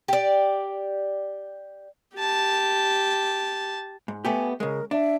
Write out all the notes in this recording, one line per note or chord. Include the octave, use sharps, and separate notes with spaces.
G4 D5
G4 A5
G#2
A3 B3 G4 G#5
C#3 G#3 A#4
D4 E5